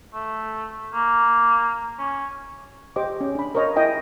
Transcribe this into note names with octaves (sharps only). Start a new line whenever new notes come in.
A3
A#3
C#4
G4 C5 D#5 D6
C#4
D4 B5
A#4 C5 C#5 D#5 A#5
E4 D#5 G5 G#5